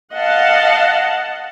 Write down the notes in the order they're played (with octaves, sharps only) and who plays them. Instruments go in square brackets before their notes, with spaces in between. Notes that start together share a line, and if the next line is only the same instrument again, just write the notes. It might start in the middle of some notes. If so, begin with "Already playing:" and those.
[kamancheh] D#5 F5 [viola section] F#5 A5